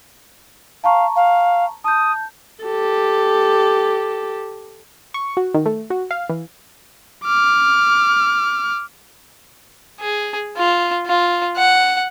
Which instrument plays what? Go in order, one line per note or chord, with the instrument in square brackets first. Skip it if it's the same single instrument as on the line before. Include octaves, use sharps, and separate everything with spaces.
[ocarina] F5 [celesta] A5 A#5 C#6
[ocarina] F5
[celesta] A5 G6 [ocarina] D#6
[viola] G4 A4
[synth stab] C#6
F#4
D#3
A3
F#4
F5
E3
[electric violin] D6 F6
[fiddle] G#4
F4
F4
F#5